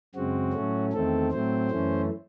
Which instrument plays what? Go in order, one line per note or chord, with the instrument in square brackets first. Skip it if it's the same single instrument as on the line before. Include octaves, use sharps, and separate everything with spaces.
[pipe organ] F#2 C#3 G#3 C4 F#4
A2 F#3 A3 C#4
E2 D#3 A3 C4 A4
A2 F#3 A3 C4 C5
F#2 E3 A3 C#4